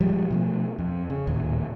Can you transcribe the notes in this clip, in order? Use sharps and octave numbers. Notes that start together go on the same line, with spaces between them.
F3 G3 G#3
B2 F3 A3
F2
C#3
D1 D#2 A#2